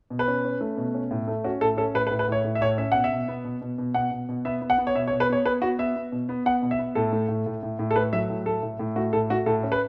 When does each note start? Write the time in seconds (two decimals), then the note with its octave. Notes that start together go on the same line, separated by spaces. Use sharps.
0.10 B2
0.19 B4
0.28 C#4
0.44 C#4
0.61 A3
0.77 B2
0.94 C#4
1.11 A2
1.28 A3
1.44 C#4 F#4
1.61 A2 A4
1.77 C#4 A4
1.94 A2 B4
2.07 B4
2.11 A2
2.19 B4
2.28 A2 C#5
2.44 A2
2.55 E5
2.61 A2 C#5
2.78 C#4 E5
2.92 B2 F#5
3.04 E5
3.12 B2
3.28 B3
3.45 B2
3.61 B2
3.78 B2
3.94 B2 F#5
4.11 B2
4.29 B2
4.45 B3 E5
4.62 B3
4.70 F#5
4.78 B3
4.87 C#5
4.95 B2 E5
5.08 C#5
5.12 B2
5.20 B4
5.29 B3 C#5
5.45 B3 B4
5.62 B3 F#4
5.79 B3 E5
5.96 B3
6.12 B2
6.29 B3
6.45 B3 F#5
6.62 B2
6.71 E5
6.79 B3
6.95 A2 A4
7.13 A3
7.29 A2
7.46 A2
7.63 A2
7.79 A2
7.91 A4
7.96 A3 B4
8.13 F#3 E5
8.30 A2
8.46 A3 A4
8.63 A2
8.79 A2
8.96 A3 F#4
9.13 A2 A4
9.30 A3 F#4
9.46 A2 A4
9.63 C#4
9.72 B4